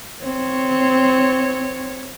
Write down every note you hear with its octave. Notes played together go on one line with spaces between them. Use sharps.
C4 C#5